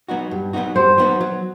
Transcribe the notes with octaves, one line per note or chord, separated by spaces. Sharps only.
F#3 B3 D#4 F#4
G2
F#3 B3 D#4 F#4
G2 C5
F#3 B3 D#4 F#4
F#3